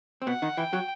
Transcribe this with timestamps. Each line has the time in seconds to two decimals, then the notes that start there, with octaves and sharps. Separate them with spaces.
0.22 C4
0.27 B2 B3 F#5
0.42 D#3 D#4
0.57 E3 E4 G5
0.73 F#3 F#4